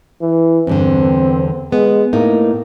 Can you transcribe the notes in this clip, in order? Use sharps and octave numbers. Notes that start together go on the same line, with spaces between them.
E3
E2 G2 D3 C4
G#3 B3
A2 A#3 D#4